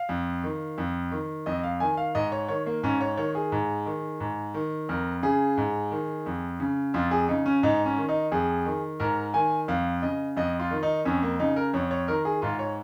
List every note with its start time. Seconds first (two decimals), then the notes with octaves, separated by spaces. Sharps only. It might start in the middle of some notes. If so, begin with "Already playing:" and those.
Already playing: F5
0.09 F2
0.44 D#3
0.78 F2
1.11 D#3
1.46 F2 D#5
1.63 F5
1.80 D#3 G#5
1.97 F5
2.15 G#2 D#5
2.32 C#5
2.49 D#3 C#5
2.66 A#3
2.83 G#2 C#4
3.01 C#5
3.17 D#3 C#5
3.35 G#4
3.52 G#2
3.86 D#3
4.20 G#2
4.54 D#3
4.89 F2 A#4
5.23 C#3 G#4
5.57 G#2
5.91 D#3
6.26 F2
6.60 C#3
6.94 F2 F4
7.11 G#4
7.28 C#3 D#4
7.46 C#4
7.63 G#2 D#4
7.86 C#4
7.98 D#3
8.09 D#4
8.32 F2 G#4
8.66 D#3
9.00 G#2 A#4
9.34 D#3 G#5
9.68 F2 F5
10.02 C#3 D#5
10.37 F2 D#5
10.59 F4
10.71 D#3
10.83 D#4
11.05 F2 C#4
11.22 A#3
11.39 C#3 D#4
11.56 A#4
11.74 F2 C#5
11.91 C#5
12.08 D#3 A#4
12.25 G#4
12.42 G#2 F4
12.59 C#5